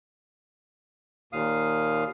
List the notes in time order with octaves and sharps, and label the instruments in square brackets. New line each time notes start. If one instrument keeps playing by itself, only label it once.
[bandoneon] D#2 A#2 F5 D#6